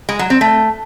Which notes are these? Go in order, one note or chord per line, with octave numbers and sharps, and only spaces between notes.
G#3
F#3
C4
A3